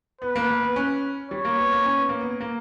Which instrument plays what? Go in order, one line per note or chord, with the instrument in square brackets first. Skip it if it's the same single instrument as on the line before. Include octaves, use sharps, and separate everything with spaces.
[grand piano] B3 [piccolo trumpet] B4
[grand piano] A#3
A#3
B3
C#4
[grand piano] G3 [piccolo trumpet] C#5
[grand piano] A#3
B3
A#3
C#4
B3
A#3
B3
A#3